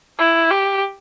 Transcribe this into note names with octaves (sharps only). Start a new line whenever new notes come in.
E4
G4